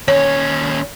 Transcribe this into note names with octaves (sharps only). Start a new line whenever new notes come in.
D#2 C#4 C#5